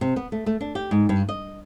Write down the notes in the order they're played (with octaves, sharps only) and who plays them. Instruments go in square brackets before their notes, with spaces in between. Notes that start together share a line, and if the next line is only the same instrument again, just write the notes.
[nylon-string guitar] C3
B3
A3
A3
D4
G4
G#2
G2
D#5